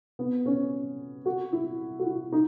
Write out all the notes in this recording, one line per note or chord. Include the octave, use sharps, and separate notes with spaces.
B3
C#4
F#4
E4
F#4
E4
D#4